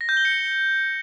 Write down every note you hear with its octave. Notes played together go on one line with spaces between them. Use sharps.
A#6
G6
G7
C#7